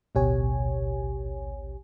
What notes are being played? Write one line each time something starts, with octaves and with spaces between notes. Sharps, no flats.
A1 D2 B2 G4 C#5 G#5